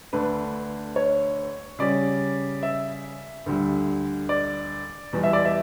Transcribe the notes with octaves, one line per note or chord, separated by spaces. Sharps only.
D2 D3 A3 D4 B4
C#5
C#3 G3 C#4 D5
E5
D2 D3 G3
D5
E2 B2 G3
E5
D5
E5